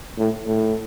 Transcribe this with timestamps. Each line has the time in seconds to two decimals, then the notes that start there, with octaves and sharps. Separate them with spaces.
0.18 A2
0.47 A2